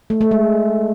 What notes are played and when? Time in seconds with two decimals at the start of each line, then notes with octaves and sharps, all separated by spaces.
0.10 A3
0.21 A3
0.31 G#3